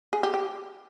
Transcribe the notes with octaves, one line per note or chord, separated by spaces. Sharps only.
G#4
G4
G4